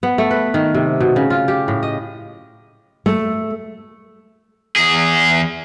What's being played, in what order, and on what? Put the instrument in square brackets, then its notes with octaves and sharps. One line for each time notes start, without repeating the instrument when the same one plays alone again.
[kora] B3
A3
B4
D#3
C3
B2
C#3
F4
G4
A2
D#5
[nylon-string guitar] A3
[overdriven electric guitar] E2 G#4